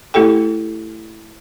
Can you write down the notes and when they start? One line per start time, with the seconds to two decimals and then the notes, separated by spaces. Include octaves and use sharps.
0.14 A3 E4 G4 A4 G5